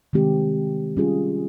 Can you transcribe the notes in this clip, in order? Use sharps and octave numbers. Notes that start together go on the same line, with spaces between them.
C3 D#3 G#3 C4 G4
G3 C#4 F4 G#4